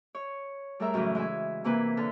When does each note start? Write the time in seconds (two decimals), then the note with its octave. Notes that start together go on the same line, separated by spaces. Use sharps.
0.15 C#5
0.80 G3 A3 G#4 A#4 E5 A#5
0.94 F#2 A2 C#3 E3
1.15 G#3 E4 E5 G#5
1.64 C3 E3 A#3 B4 G#5
1.97 D3 A4 F6